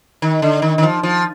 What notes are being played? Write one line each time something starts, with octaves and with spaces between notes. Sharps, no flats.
D#3
D3
D#3
D#3
F3
F3